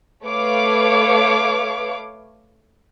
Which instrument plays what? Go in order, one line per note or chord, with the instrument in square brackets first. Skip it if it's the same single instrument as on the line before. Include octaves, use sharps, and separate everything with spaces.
[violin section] A3 B4 C#5 F5 D6